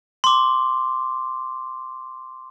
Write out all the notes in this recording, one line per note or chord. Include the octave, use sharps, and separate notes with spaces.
C6 D6